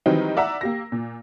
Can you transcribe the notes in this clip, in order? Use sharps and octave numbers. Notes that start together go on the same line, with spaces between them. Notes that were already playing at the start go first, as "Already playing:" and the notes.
D#3 E3 F#3 G3 C4 D#4
D5 E5 F#5 A#5 E6
A#3 G4 A#6
A#2